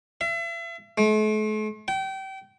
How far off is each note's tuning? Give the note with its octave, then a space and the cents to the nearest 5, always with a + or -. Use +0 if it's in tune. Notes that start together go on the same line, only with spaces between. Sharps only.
E5 +40
A3 -45
G5 -30